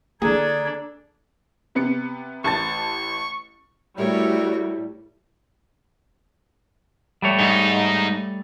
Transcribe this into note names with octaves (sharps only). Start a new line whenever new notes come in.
D3 A#3 D4 G#4 A4 A#5 G#6
C3 B3 C#7
A1 A5 C#6 A6
A2 G3 A3 F#4 A#4 C#5
G3 A3 C#5
G#2 D#4